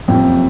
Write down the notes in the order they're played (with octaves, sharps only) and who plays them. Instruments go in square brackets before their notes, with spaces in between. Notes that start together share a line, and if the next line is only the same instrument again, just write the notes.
[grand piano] F#1 F2 C3 F3 G5